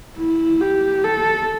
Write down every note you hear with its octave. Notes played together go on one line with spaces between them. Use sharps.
E4
G4
A4